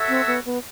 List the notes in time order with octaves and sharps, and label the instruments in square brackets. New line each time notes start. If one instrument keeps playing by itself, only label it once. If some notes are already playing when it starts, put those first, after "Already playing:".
Already playing: [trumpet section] F#4 A4 C#5 E5
[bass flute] C4
B3
B3